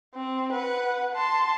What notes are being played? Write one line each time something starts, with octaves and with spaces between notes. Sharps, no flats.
C4
B4 F#5
A5 C6